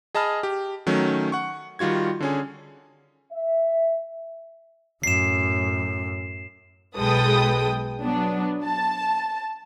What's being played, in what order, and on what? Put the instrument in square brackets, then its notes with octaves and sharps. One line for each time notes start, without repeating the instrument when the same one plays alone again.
[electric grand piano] G#4 D#5 A5 B5 F6
G4
D#3 F#3 A3 C#4
F#5 C#6
D#3 G3 F4 F#4 G#6
D3 C#4 G#4
[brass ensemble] E5
[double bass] F#2 A2 [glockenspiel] C7 E7
[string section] B1 G#3 A4 B4 G5 D#6
F#3 B3 D4
A5